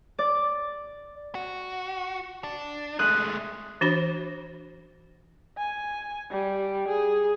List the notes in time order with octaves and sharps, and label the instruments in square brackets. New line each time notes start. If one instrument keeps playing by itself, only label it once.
[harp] D5
[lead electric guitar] F#4
D4
[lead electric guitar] G#3 A3 [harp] D#6 F#6
[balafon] E3 D4 F#4 C5 B5
[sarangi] G#5
G3
G#4